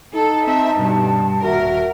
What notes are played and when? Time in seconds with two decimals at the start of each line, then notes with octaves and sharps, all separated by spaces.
0.15 D#4 A4 A5
0.47 C4 E5
0.79 G2 B2
1.44 D#1 F#4 A#4 E5